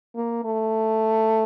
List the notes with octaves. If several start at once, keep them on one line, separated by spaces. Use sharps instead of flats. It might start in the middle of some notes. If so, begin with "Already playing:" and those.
A#3
A3